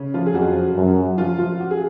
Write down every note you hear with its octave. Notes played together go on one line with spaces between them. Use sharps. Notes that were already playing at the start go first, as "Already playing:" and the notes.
Already playing: C#3 C#4
F3 F4
G#4
F2 F#3 F#4
F#2
F3 F4
F3 F4
F#4
G#4